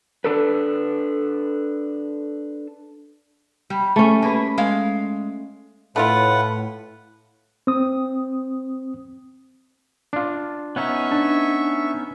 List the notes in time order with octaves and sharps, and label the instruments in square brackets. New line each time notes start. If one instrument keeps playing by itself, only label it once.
[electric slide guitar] D4 A4 B4
[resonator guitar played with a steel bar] G3
[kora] A3 C#4
[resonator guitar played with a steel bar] A#3 G#4 B4
G#3 F5
[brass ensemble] A2 [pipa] A3 E4 F4 [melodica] B4 F#5
[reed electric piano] C4 D#6
[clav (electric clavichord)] D4 F4
[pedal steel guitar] B3 C#4 D#4 [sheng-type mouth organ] E5 C#6
[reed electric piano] D4 [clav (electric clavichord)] A5